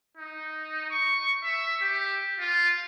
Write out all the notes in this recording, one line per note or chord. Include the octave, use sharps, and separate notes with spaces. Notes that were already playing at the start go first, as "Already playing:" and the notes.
D#4
C#6
E5
G4
F4